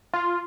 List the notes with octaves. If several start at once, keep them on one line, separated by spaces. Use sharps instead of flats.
F4